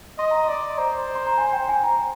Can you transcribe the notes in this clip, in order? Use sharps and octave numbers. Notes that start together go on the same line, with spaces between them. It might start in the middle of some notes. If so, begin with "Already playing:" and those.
D#5 C6
A#5
D5 C6
C5 A#5
C6
A#5
G#5
G5
G#5
A#5